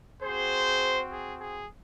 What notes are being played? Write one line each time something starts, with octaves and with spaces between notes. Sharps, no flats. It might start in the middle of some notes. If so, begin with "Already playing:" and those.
C4 F#4 G#4 C5
G#4
G#4